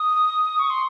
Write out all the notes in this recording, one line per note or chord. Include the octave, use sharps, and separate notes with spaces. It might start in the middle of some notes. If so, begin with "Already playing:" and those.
Already playing: D#6
C#6
C6